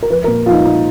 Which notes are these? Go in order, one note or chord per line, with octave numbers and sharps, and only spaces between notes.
A#4
F3 B4
A#2 A#4
F3 D#4 F4
A#2 D#4